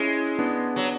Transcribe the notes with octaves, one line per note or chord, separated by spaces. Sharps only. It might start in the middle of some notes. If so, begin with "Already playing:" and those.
Already playing: G#3 C#4 E4
B3 D4
F#3